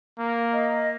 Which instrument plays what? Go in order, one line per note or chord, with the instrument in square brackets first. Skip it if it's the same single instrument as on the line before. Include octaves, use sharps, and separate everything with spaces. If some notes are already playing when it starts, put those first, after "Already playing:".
[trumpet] A#3
[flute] D#5